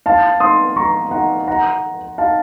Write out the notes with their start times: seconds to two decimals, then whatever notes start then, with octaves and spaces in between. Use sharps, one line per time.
0.06 F5 A5
0.40 C6 D#6
0.76 A#5 C#6
1.11 F#5 A#5
1.48 F#5 A#5
2.18 F5 A5